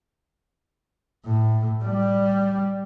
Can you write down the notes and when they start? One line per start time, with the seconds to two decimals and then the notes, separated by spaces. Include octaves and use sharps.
1.26 A2
1.84 G3